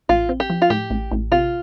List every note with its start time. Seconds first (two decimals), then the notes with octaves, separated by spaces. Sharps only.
0.09 A1 F4
0.29 C4
0.40 G4
0.50 F3
0.62 F4
0.70 A2 G4
0.90 A1
1.12 A1
1.31 C3 F4